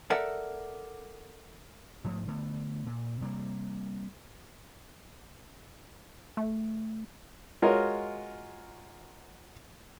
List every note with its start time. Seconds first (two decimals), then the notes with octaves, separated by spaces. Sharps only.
0.10 A4 A#4 D5 E5 F#5
2.04 G#2 F3 A3
2.28 D3 A3 B3
2.86 A#2
3.21 C3 G3 A3 A#3
6.37 A3
7.62 G#3 F4 F#4 A#4 C#5 D#5